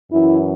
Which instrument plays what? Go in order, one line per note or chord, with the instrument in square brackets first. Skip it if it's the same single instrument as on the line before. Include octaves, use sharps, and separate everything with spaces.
[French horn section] F#2 E3 E4